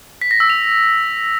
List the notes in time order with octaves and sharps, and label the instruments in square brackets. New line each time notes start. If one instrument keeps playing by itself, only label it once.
[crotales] B6
A#6
E6
F7